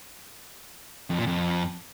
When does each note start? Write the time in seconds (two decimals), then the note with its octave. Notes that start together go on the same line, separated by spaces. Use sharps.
1.10 F2
1.18 A#2
1.27 F2